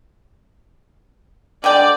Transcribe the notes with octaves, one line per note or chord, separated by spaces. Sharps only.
D3 G#3 D5 G5